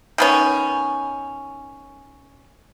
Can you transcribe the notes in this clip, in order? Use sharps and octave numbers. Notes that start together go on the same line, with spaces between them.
D#3 B3 C#4